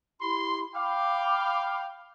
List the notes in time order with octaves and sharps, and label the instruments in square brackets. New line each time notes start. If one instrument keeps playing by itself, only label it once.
[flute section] E4 G4 B5 [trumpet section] C6
[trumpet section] F5 G5 [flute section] B5 D6